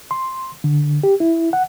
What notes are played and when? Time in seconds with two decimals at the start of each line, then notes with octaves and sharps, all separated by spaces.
0.11 C6
0.64 D3
1.03 G4
1.20 E4
1.53 F#5